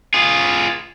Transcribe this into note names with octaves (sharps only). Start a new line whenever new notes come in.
F4 G#4